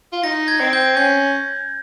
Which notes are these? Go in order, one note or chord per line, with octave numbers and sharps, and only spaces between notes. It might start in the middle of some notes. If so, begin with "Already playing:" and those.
F4
D#4 A#6
G#6
C4
G6
C#4 G6